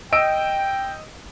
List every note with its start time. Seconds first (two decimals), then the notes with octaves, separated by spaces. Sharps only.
0.12 D#5 G5 E6 D7